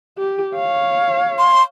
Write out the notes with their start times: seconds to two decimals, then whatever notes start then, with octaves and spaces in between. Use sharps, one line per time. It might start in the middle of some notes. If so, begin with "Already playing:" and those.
0.18 G4
0.56 C#5 F5
1.38 C6